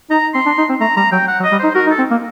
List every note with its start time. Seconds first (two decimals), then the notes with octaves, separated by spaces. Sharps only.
0.10 D#4 A#5
0.34 C4 C6
0.46 D4
0.58 D#4
0.69 C4
0.80 A3 A#5
0.97 G3 A#5
1.12 F#3 G5
1.28 F#5
1.40 F#3
1.44 D#5
1.52 G3
1.59 D#4 C5
1.75 F#4 A#4
1.87 D#4
1.91 A4
1.98 C4
2.10 A#3